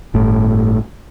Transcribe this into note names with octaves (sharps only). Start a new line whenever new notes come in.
G1 A2